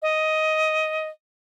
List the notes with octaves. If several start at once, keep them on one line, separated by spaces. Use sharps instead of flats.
D#5